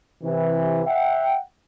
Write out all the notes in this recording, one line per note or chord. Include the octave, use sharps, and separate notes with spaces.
C3 E3
E5 F#5 G5